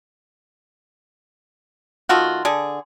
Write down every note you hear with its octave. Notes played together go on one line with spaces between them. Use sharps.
D#3 A3 F4 F#4
D3 G#4